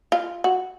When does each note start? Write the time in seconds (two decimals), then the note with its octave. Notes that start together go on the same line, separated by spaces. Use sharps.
0.12 F4
0.44 F#4